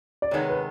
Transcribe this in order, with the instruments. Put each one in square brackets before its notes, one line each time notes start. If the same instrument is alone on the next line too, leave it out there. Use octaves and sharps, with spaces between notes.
[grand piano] D5
[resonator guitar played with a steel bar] C3 D#3 G#3 B3 [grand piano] C#5
[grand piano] B4